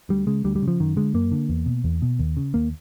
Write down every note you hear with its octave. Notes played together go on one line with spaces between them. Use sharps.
D2 G3
C#3 G#3
D2 G3
G3
C#3
F3
F#2 D#3
D3 G#3
F#2 A#3
D3
E2
B2
E2
B2
D#2
C#3
D#2 A#3